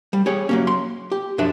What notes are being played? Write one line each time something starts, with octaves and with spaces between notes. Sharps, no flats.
G3
G4 G#4 C#5
F#3 A#3 C#4
C6
G4
F#2 F3 D4 B4 E5